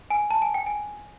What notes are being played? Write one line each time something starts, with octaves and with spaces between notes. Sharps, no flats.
G#5
A5
G#5
G5
G#5